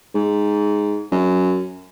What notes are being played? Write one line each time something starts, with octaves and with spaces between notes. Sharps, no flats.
G#2
F#2